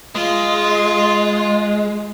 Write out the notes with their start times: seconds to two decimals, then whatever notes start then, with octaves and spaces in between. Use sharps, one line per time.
0.15 G#3 F4